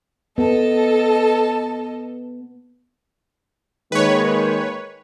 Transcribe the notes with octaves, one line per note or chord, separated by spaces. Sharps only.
B3 A4 D#5 A5
D#3 G#3 A#3 B4 C#5